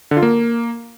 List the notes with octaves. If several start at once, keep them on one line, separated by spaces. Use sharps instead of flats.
D3
F4
A#3